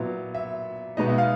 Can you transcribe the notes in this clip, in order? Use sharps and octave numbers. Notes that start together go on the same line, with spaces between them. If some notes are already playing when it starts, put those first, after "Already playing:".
Already playing: A#2 F#3 B3 E4
E5
B2 G#3 B3 D#4 D#5
E5
F5